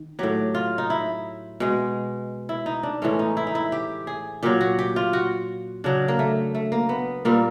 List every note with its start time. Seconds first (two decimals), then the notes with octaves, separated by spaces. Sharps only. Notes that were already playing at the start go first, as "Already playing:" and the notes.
Already playing: D#3
0.19 A2 F#3 G4
0.55 F4
0.78 D#4
0.90 E4
1.60 B2 G#3
2.49 E4
2.66 D#4
2.83 D4
3.02 A2 E3 G#3 C#4
3.19 D#4
3.37 E4
3.47 D#4
3.55 E4
3.72 G4
4.07 G#4
4.43 A#2 F#3 G4
4.61 F#4
4.79 G4
4.96 F4
5.13 F#4
5.84 C#3 F#3 D4
6.08 A#3
6.19 A3
6.55 A3
6.72 A#3
6.89 B3
7.25 A#2 G3 A#3